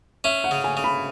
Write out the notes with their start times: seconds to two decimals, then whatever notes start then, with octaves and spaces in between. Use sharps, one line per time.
0.24 C#4 E5
0.44 F#5
0.51 C#3
0.64 G#5
0.77 C#3
0.84 B5